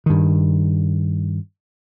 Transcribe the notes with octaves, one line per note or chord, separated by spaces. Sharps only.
G2 D#3